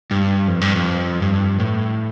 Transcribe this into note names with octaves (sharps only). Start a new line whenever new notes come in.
G2
F2
G2
F2
G2
A2